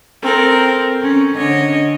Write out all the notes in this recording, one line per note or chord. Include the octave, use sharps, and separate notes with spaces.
C4 A4 A#4
C#4
D3 C#5 D#5